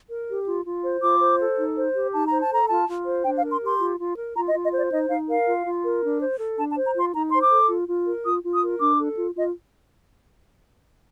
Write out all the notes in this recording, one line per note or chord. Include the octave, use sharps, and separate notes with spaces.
A#4
G4
F4
F4
C5
F4 D6
C5
A4
D#4
C5
G4
D#4 A5
C5 A#5
A5
A4 A#5
F4 A5
F4
C5
D4 G5
F5
A#4
C6
G4
C6
F4
F4
A#4
F4 A#5
D#5
F4
D#5
C5
D5
D#4 D#5
D#4 F5
A#4 F5
F4
F4
A#4
D4
C5
A4
D4 A5
A5
C5
A#5
F4 C6
D#4 A#5
C5 C6
D6
A4
F4
F4
A#4
F4 D#6
F4
D#6
A#4
D4 D6
A4
F4
F4 D#5